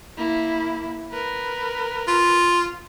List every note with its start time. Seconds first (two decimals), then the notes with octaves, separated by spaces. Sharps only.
0.17 A#3 E4
1.11 A#4 B4
2.08 F4